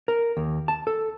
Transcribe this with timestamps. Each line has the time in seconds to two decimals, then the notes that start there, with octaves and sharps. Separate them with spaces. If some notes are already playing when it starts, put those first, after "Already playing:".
0.08 A#4
0.37 D#2
0.68 A5
0.87 A4